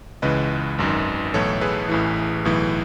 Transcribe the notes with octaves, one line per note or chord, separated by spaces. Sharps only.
C#2 C#3 E3 B4 D#5
G#1 F#2 D#3
B1 A2 E3 A4 C#5
G#4 B4
A1 A2 E3
B1 A2 E3